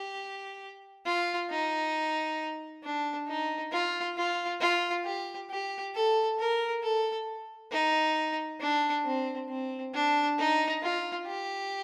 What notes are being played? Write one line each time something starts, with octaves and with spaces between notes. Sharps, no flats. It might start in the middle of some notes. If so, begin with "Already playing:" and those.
Already playing: G4
F4
D#4
D4
D#4
F4
F4
F4
G4
G4
A4
A#4
A4
D#4
D4
C4
C4
D4
D#4
F4
G4